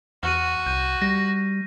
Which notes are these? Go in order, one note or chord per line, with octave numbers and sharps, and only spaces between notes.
E2 F#4 F6 D#7
C2 G6 D#7
G3 A#6